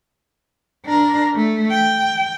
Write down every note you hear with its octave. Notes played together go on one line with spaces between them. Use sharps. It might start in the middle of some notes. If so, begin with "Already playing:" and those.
D4 A#4
A3
G5